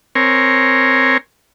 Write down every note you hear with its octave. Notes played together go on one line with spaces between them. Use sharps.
C4 A#4 C#5 G#5